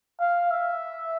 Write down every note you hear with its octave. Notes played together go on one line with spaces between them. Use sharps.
F5
E5